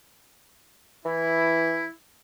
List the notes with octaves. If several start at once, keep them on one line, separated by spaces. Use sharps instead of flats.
E3 E4